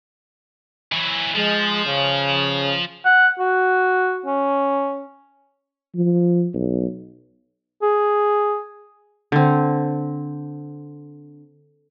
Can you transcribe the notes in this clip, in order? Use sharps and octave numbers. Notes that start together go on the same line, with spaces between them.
E3 F#3
F3 G#3
C#3
F#5
F#4
C#4
F3
B1
G#4
D3 C4